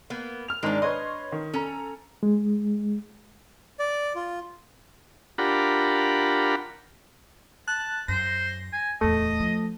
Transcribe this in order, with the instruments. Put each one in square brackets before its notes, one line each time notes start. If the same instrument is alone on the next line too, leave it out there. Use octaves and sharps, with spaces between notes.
[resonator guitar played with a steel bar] A#3 B3
[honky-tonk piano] F6 F7
[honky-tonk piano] G#2 D#3 D#4 [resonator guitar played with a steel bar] G#3 D4
[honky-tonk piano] B4 C#5 C6 [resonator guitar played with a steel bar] D#5
[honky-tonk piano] D#3
[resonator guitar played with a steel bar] C#4 [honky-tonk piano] A4 A#5
[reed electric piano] G#3
[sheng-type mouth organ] D5
F4
[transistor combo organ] D4 F4 G4 A#4 F#5 B5
[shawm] A5 [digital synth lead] F#6
[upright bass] F#2 [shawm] C5 [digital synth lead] A#6
[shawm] G#5
[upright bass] D1 E2 [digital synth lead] A3 [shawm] D#5
[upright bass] F3